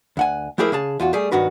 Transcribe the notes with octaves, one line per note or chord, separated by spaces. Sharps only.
D2 F#5 G#5
F3 A3 E4 G4 G#4 A#4
C#3 G#4 A5
E2 F4 F#4
G3 A3 G#4
B1 G2 D#3 F#4 B4